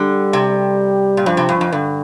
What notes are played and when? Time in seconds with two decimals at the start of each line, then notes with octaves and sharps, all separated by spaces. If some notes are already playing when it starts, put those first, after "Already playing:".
Already playing: D3 G3
0.33 C3
1.17 A#2
1.26 G2 F3
1.37 C3
1.49 G2
1.61 F2
1.72 G2 D3